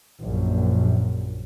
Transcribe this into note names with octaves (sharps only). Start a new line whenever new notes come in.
A#1 F#2